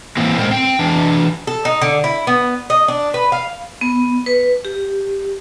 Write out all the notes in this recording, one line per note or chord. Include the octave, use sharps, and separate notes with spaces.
E3 A#3 C4
A#2 G#3 A#4 C5 G5
C4 G5
E3 D4
A4
D#4
D3
E4
B3
D#5
D4
B4
F5
B3
B4
G4